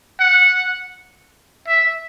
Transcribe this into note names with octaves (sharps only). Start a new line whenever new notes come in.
F#5
E5